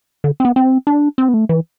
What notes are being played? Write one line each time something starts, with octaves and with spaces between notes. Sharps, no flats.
D3
C4
B3
C4
D4
C4
B3
A3
E3